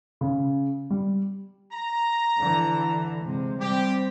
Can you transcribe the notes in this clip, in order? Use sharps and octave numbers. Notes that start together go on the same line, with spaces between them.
C#3
G3
A#5
D3 E3
C3 G#3
G3 C4 G4